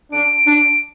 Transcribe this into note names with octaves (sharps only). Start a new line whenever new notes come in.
D4 D7
D4